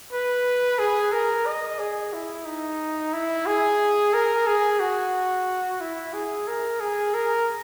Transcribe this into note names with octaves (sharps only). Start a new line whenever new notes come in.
B4
G#4
A#4
D#5
G#4
E4
D#4
E4
G#4
A#4
G#4
F#4
E4
G#4
A#4
G#4
A#4